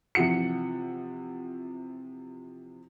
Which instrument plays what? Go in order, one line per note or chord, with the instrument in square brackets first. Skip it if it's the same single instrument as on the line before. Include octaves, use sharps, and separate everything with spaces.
[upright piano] C3 E3 F3 F#5 C#7